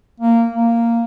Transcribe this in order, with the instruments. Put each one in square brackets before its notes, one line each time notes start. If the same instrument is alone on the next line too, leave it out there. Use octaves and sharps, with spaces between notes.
[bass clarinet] A#3
A#3